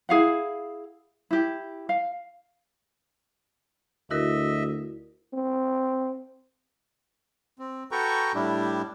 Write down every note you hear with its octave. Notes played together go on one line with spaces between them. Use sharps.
E4 G#4 F5 F#5
E4 G4
F5
D2 E4 F#4 A#4 D#5 E5
C4
C4
F#4 A4 B4 G5 A#5 C#6
A2 G3 D4 E4 G4